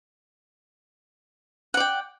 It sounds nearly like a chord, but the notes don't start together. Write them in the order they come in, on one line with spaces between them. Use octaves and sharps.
F#5 D5 G5